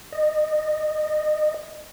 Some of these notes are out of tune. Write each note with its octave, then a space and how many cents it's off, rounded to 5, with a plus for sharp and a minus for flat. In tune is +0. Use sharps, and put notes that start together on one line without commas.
D#5 -20